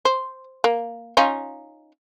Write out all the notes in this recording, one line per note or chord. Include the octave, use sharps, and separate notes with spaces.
C5
A#3
C#4 D#4 F4